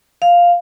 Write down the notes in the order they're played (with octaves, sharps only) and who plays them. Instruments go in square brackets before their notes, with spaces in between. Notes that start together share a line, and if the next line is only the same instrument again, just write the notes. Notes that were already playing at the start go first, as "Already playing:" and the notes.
[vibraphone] F5